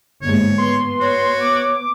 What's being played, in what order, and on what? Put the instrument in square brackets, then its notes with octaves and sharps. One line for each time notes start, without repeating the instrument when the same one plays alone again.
[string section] G1 D#2 G#2 [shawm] C#5
[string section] B3 [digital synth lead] C6
[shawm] F#4 [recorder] C#5
[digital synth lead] D6